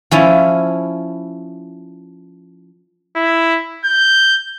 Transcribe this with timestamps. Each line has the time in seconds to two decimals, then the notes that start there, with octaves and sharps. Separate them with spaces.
0.11 F3 C#4 E4
3.16 E4
3.85 G6